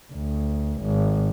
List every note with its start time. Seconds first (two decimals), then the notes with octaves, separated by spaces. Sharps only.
0.13 D2
0.82 G#1